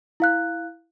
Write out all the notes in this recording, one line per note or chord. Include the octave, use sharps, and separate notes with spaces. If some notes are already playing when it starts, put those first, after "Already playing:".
E4 F5 F#6